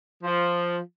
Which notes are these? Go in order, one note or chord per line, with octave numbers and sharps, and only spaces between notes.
F3